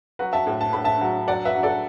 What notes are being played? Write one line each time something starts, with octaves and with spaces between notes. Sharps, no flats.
F#3 F#4 B4
E5 A5
A2
A5
A2 B5
E5 A5
F#3
F#3 D5 F#5
B4 E5
F#3
A4 D5